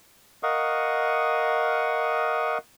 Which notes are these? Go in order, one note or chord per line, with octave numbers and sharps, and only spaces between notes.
A#4 D#5 F5 F#5 C#6 D#6